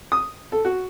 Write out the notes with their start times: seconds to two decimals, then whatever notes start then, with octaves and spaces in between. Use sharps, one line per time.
0.12 D#6
0.52 A4
0.65 F#4